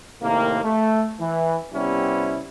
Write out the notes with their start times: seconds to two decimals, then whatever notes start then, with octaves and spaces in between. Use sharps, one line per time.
0.22 A2 C3 D#3 A#3
0.64 A3
1.20 E3
1.74 C3 G3 B3 C#4 E4